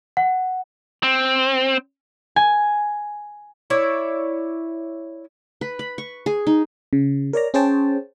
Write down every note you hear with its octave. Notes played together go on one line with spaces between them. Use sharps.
F#5
C4
G#5
E4 C#5 D5
B4
B5
C#6
G#4
D#4
C#3
A#4 C#5 D5 A#5
C#4 G#4 C5 C#5 G5 A5